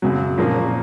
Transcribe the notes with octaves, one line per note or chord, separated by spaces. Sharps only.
F#2 C#3 F#3
A#2 F3 A#3 C#4